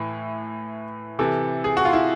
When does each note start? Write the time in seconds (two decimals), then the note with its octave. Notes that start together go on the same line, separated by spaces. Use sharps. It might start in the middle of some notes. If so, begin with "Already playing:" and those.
Already playing: A2 E3
1.19 C3 E3 A4
1.64 G#4
1.77 F#4
1.85 F4
1.93 E4